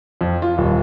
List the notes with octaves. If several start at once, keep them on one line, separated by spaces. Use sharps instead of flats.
F2
F4
D#1